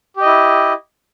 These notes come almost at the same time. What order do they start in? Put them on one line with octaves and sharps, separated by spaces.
G4 D#5 E4